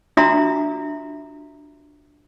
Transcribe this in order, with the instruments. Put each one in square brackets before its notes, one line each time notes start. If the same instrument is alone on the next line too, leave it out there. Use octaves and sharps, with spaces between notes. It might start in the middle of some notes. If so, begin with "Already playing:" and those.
[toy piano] D4 F4 F#4 E5 A#5 C6